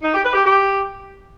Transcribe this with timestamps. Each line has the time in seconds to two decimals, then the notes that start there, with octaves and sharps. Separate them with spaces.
0.02 D#4
0.12 G4
0.22 B4
0.33 G4
0.43 G4